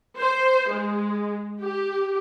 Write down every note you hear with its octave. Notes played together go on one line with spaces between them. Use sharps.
C5
G#3
G4